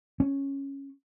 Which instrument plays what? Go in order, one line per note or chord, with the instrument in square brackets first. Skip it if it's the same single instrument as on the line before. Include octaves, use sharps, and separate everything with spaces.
[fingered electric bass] C#4